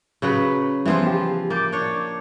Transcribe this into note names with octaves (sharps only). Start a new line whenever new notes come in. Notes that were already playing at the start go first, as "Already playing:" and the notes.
C#3 F#3 B4
E3 F3 G3 B3 F4
G4
A#3 D6 G6 A6
D4 C#5